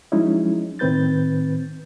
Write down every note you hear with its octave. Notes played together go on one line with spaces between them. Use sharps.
F3 F#3 G#3 C#4 D#4 E4
A2 D#3 C4 B4 G6 A6